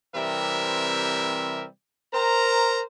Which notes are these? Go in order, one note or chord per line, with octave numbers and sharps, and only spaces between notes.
C3 E3 G3 C4 A#4 E5
A#4 C5 A#5